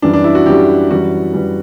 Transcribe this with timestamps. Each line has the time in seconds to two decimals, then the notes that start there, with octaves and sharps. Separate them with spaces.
0.02 F#2 E3 G3 D4
0.13 D4
0.24 E4
0.35 F#4
0.46 F#2 E3 G3 G4
0.90 F#2 E3 G3 F#4
1.34 F#2 E3 G3